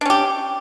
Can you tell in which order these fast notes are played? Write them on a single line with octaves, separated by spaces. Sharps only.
D4 C#4 G4